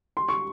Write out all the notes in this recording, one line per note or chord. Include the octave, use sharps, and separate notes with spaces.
C6
C#6